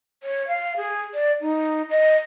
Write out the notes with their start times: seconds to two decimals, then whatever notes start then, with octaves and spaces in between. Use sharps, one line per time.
0.23 C#5
0.48 F5
0.77 G#4
1.14 D5
1.41 D#4
1.90 D#5